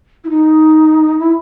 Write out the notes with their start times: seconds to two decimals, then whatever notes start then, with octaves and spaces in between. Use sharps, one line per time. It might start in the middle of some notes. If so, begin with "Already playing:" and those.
0.24 E4
0.30 D#4
1.19 E4